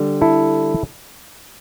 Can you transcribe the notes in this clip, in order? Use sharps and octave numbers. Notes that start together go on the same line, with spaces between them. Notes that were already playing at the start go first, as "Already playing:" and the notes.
Already playing: D3 G3
E4 A4